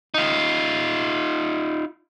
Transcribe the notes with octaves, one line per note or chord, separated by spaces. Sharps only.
D#4 F4